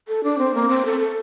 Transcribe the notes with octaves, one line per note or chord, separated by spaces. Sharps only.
A4
D4
C4
A#3
C4
A4
A4